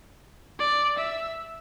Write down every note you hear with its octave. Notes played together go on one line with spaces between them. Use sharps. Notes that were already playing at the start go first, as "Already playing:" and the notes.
D5
E5